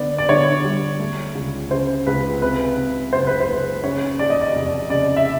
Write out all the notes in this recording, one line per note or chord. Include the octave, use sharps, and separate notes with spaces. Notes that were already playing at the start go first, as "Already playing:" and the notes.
Already playing: D3 B3 D5
D5
D3 C#5
G3
A3
C#2
C#3 C5
C#2 B4
C3 B4
C3
F#1 C5
B4
C5
F#1
C#3 C#5
D#2 D5
D#5
D5
F1 D5
C#3 D5
E5